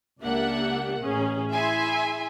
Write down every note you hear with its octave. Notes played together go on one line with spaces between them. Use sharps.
C#2 A#3 D4 G4 E5 F#5
A1 C#4 G#4
E4 G#4 E5 G#5 C6